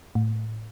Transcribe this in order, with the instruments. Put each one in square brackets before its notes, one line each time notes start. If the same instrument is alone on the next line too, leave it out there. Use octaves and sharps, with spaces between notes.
[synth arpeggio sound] A2